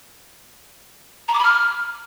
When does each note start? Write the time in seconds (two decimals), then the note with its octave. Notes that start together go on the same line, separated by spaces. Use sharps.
1.28 A#5
1.33 D6
1.38 B5
1.44 F6